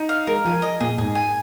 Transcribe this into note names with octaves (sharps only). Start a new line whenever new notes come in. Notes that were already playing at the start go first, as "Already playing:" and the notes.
Already playing: D#4
F5
G#3 A#4
F3 G#5
D#5
A#2 G#4
G#2 G#4
G#5